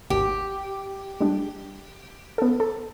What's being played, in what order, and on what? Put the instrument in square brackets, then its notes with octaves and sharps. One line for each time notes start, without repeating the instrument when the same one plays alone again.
[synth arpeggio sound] G#1 D#2 [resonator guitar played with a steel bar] G4
[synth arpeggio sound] G3 G#3 D4
B3 A4
A4